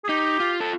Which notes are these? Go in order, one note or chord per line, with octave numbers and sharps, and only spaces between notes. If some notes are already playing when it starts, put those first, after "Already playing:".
G#4
D#4 G4
F4
A4